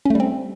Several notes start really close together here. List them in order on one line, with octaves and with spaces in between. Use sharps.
C#4 A3 G3 C4